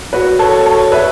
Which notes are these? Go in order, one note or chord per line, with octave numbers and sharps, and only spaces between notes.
F#4 B4
A4 C#5
A4 C#5
B4 E5